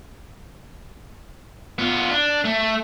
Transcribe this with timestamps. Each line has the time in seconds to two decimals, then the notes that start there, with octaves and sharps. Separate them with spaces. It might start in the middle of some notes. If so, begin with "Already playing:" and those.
1.79 B3 F4
2.11 D4
2.44 A3